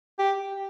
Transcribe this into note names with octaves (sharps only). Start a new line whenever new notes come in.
G4